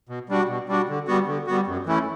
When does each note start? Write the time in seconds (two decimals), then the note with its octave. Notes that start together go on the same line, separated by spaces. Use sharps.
0.09 B2
0.29 G3 D4 F#4
0.48 B2
0.69 G3 D4 F#4
0.89 D3
1.07 G3 B3 F#4
1.28 D3
1.47 G3 B3 F#4
1.67 F#2
1.87 E3 A3 C#4 E4